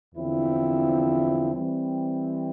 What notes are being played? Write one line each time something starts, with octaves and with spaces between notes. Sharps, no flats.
E2 D3 F3 C4 E4
E3 G3 C4